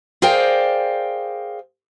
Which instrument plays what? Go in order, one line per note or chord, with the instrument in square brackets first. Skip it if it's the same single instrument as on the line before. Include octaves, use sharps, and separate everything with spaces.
[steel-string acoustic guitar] G#4 A#4 C5 D5 F5 G5